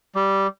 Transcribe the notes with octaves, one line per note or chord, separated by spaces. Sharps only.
G3